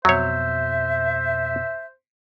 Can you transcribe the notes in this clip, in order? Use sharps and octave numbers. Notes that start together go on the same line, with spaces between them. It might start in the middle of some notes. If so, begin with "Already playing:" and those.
F2 B2 F#3 C5 C#5 E5